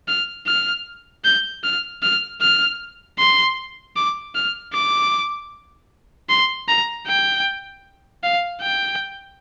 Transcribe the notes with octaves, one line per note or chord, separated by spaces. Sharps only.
F6
F6
G6
F6
F6
F6
C6
D6
F6
D6
C6
A#5
G5
F5
G5